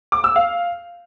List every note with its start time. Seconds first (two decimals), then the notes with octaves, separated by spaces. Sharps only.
0.12 D6
0.24 E6
0.36 F5